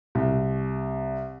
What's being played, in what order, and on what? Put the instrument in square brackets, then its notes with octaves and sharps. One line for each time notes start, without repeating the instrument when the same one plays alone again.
[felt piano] C2